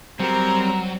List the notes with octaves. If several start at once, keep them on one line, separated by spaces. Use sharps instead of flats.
F#3 G3 C4 A#4